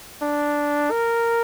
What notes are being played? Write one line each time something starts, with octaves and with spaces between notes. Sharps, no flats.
D4
A#4